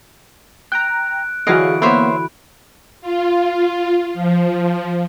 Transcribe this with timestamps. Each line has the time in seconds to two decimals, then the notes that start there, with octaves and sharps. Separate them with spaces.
0.72 G5 A#5 F#6 D7
1.47 D3 E3 F#3 F#4 G#4 D#5 F5 D7
1.82 A#3 B3 C5 C#5 E5 B5
3.01 F4
4.14 F3